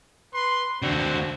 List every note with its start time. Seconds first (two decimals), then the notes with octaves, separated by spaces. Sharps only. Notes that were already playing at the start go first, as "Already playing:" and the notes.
0.33 B4 C6
0.82 D#2 D3 C4 F#4